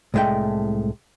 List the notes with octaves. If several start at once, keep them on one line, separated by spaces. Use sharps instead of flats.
C2 A2 G#3 A3 G5